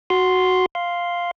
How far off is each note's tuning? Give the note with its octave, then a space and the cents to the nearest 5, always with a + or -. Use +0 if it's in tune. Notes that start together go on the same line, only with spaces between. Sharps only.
F#4 +0 C6 +0
F5 +0 C6 +0